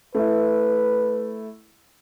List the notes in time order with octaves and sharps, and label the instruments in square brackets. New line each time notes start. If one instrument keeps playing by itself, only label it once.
[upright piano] A3 E4 [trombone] B4